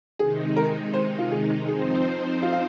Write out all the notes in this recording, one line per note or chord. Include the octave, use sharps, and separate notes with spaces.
C3 D#3 G#3 D#4 G#4
A#4
C5
F4
G#4
F2 F3 C4 D#4 G#4 C5
F4
F5